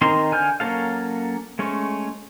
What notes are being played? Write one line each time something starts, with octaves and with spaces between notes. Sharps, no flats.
D#3 C4 D#4 A#4 C6
D3 G#5 F6 G6
F#3 A#3 C#4 A4 F5
G#3 A3 C#4